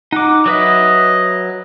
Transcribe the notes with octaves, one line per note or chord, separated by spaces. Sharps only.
D#4 F#5 D6
F#3 B4 D#5 E5